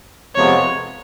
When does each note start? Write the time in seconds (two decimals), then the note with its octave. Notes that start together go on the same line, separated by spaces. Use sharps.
0.35 F2 C3 F3 G#3 B3 C#5